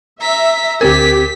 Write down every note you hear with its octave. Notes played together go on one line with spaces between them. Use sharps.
E5 A#5 B6
D2 C4 G4 A#4 G#6 B6